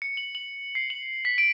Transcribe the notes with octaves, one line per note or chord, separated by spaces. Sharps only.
C#7
F#7
F#7
C7
F#7
B6
D7